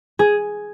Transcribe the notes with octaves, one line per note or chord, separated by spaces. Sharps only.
G#4